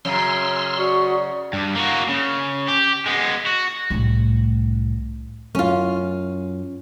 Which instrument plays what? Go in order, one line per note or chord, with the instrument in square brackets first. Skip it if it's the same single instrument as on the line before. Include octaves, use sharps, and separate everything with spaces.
[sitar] F#2 C#3 [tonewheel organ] C6 E6 F6
[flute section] F#4 C#6 D#6 [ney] D5
[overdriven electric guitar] G2
A#3 F#4
C#3
G4
G#3 B3
F#4
[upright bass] C2 A2
[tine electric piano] F#2 [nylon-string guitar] C#4 F4